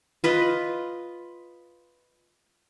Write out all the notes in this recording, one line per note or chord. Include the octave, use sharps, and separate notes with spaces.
F4 B4 D#5